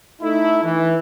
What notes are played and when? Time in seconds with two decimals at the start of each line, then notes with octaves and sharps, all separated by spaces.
0.22 A3 D#4 E4
0.64 E3